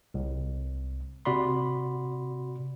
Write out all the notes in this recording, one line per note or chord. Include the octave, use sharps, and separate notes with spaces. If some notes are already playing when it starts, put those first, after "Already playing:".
C2
C3 F#4 D5 B5 C6